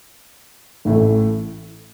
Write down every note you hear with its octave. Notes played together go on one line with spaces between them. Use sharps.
A1 A2 E3 A3